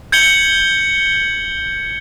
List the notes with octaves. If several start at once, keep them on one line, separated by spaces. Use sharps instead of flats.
G6 G#6 C#7 F#7 G7